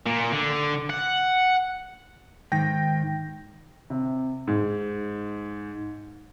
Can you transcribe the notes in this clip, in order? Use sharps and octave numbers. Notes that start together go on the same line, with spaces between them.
A#2
D3
F#5
G#2 D#3 G5 A#6
C3
G#2